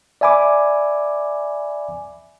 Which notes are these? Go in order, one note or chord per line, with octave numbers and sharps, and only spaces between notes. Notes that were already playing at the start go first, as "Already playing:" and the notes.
D5 E5 G#5 B5 D6